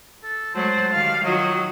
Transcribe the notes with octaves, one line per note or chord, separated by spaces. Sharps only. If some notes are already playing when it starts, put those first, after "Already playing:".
A4
F#3 G#3 A3 C5 A5
D#3 G3 F5
D#3 F3 F#3 D#5